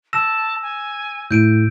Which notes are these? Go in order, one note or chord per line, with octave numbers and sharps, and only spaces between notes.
A5 E6 A#6 E7
G#5
A2 G6 D7 D#7